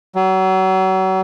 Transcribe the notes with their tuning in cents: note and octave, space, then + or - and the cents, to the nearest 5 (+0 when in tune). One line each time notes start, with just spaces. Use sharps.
F#3 +35